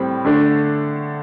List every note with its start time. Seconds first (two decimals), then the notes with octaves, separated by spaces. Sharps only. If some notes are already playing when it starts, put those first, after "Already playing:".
Already playing: A2 G3 C4
0.25 D3 A3 D4